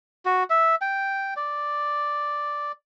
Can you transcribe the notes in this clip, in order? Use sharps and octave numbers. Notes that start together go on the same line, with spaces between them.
F#4
E5
G5
D5